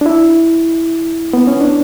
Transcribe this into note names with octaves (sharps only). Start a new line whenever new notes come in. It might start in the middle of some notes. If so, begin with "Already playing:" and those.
D4
E4
B3
C#4
D4